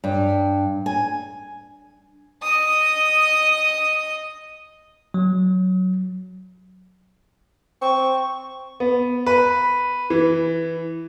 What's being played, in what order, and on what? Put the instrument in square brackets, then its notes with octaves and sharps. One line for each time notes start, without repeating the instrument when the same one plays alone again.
[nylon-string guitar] G2
G#5
[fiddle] D#5 D#6
[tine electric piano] F#3
[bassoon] C4 [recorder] C#6
[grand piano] B3
B4
E3